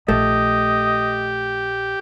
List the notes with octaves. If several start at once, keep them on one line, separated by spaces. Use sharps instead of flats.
A#1 A3 G4 D#5